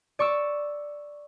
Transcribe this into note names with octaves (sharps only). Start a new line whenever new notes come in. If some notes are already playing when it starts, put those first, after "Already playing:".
D5 C#6 D6 E6